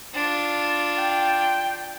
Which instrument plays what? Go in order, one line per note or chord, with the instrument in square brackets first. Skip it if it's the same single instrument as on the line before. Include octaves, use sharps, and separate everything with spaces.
[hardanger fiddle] D4 F4
[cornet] G5